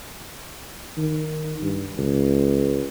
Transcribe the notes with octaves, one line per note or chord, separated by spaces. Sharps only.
D#3
G2
C#2